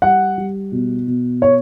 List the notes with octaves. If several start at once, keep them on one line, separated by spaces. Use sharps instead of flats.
G3 F#5
G3
B2
B2
C#5